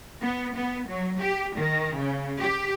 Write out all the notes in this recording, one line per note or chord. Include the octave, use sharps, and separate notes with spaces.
B3
B3
F#3
G4
D#3
C#3
G4